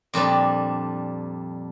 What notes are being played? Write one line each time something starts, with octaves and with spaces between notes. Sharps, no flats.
F2 A#2 G3 D4